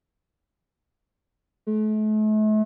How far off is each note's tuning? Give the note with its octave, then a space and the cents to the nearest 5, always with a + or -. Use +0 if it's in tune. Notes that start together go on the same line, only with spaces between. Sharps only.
A3 -40